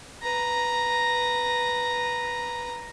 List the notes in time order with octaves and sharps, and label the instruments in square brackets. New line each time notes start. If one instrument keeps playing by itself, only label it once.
[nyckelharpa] B4 A#5